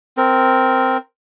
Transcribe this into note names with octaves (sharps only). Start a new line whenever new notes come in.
C4 A#4